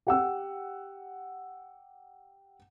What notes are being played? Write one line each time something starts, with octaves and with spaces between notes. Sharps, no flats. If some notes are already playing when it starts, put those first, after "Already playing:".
G4 F#5 E6